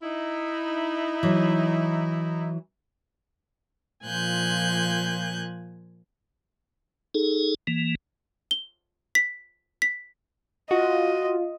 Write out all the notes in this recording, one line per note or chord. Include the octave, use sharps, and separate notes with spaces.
D#4 E4
E3 F#3
A#2 F3 G#5 F#6 G6
D#4 G#4 A4
E3 A#3
G7
B6
B6
F4 F#4 D#5